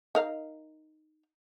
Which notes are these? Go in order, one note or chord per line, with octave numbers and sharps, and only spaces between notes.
D#4 A#4 F5